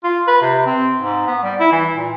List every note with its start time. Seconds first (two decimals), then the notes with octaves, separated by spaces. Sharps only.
0.04 F4
0.27 B4
0.41 C3
0.66 C4
1.01 G#2
1.27 B3
1.43 G3
1.59 E4
1.72 E3
1.96 A#2